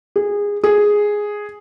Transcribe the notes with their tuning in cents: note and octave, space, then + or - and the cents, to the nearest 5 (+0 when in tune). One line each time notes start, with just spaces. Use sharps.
G#4 -20
G#4 +0